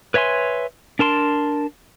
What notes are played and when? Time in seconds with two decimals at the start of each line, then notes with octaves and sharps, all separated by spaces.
0.14 B4 C#5 E5 G#5 C6
0.99 D4 A#4 A5 C6